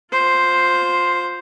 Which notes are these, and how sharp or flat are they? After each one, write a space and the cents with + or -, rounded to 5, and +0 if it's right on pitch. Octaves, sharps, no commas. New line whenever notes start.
F4 +20 C5 +0